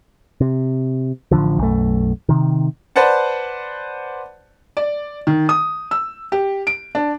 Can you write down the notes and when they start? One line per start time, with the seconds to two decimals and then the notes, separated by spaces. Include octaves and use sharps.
0.41 C3
1.31 A1 B2 D3 F3
1.59 B1 F#2 A3
2.29 C3 D#3
2.96 B4 C5 D5 F#5 A5
4.77 D5
5.27 D#3
5.49 D#6
5.91 E6
6.32 G4
6.67 D7
6.95 D4